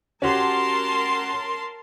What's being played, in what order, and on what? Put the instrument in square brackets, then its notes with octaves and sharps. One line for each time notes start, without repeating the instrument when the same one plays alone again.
[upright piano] C#4 F#4 G4 [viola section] A#4 A5 C6